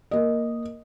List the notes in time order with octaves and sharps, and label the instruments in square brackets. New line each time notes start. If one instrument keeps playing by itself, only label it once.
[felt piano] A#3 D#5